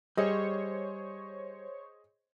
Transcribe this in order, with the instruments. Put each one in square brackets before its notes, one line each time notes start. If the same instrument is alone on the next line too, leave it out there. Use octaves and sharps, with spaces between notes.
[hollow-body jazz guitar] G3 [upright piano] G#4 D#5 [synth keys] C5 C#5 C#6